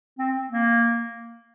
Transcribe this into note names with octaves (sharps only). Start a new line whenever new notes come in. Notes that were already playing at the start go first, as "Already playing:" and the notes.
C4
A#3